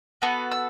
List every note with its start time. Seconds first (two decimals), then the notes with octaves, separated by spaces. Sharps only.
0.22 B3 F#4 A4
0.51 E6